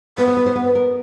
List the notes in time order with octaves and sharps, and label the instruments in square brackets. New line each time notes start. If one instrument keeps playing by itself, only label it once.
[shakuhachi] B3 [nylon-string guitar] B4
[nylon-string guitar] C5
B4
C5
B4
A#4